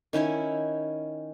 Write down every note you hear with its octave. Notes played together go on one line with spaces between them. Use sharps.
D#3 C#4 E4 C#5